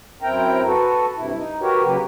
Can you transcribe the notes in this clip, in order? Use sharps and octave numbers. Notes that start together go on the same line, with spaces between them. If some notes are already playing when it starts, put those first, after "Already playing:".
F#2 C4 E4 A#4 G5 A#5
F#4 A4 B4
G2 C3 E4
D#4
F#4 G4 A#4 B4 C#5
C#3 F#3 A#3 G4 B4